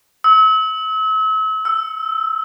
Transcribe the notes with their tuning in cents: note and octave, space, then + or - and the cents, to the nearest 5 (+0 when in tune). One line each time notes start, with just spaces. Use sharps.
E6 -40
E6 +5